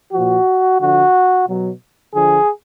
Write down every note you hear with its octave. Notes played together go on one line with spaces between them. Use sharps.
A#2 F3 F#4
D3 F3 F#4
B2 F#3
D3 F3 G#4